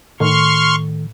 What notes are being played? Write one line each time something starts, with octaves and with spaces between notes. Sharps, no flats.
A2 D#3 C6 C#6 F6